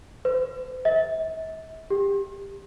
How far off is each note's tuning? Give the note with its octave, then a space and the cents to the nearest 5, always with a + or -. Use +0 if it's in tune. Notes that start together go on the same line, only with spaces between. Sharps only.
C5 -45
E5 -45
G4 +20